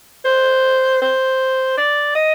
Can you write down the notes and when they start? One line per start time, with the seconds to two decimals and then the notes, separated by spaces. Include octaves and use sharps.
0.25 C5
1.01 C5
1.77 D5
2.15 D#5